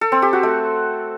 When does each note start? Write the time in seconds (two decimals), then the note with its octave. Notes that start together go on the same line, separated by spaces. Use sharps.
0.01 A4
0.12 C4
0.22 G4
0.33 F#4
0.43 A3